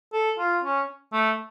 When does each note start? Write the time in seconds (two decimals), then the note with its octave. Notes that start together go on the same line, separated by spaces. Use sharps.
0.13 A4
0.38 F4
0.63 C#4
1.13 A3